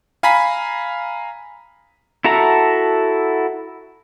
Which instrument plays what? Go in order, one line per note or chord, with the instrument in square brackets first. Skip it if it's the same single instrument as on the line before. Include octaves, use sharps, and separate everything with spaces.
[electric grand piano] F5 G#5 A#5 B5 B6
[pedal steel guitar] E4 F#4 A4 E5 A#5